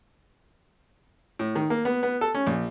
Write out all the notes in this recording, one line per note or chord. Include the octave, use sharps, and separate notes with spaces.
A2
D#3
A#3
B3
B3
A4
C#4
A#1